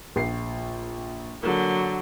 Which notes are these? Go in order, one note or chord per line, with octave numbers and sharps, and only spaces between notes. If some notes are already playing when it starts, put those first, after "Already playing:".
A#1 C7
D3 F#3 A#3